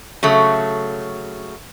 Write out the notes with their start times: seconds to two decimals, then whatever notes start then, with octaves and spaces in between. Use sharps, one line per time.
0.23 C#3 F#3 A3